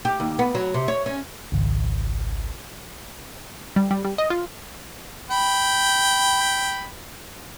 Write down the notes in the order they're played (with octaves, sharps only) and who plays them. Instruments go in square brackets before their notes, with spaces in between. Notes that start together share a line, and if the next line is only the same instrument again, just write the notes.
[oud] G4
D#2
B3
F#3
C3
C#5
C#4
[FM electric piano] G#1 C#2
[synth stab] G3
G3
G3
D#5
F4
[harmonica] G5 B5